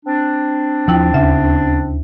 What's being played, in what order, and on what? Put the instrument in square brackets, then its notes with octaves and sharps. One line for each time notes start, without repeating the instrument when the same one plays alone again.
[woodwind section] C4 D4
[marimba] D#2 E4 G5 [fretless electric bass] F3
[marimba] D2 E5 [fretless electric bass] C#3